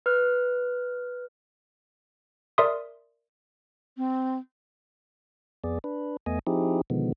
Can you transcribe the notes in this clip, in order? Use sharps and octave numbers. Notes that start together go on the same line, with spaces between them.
B4 F6
A#4 D5 E5 C6 D#6
C4
F2 B3 G#4 D5
D4 B4
E2 A3 B3 D#5 G#5
F3 C4 D#4 E4 G4 G#4
B2 D3 D#3 F3 G#3 B3